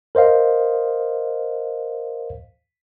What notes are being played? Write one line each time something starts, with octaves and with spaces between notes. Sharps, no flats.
A#4 C5 D#5 F5